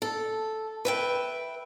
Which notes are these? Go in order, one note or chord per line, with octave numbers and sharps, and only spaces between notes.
A4
B4 E5 G5